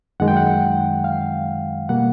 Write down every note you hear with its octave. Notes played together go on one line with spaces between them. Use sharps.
F#2 D#3 G#3 F#5
G5
F#5
F5
B2 G3 A#3 F#5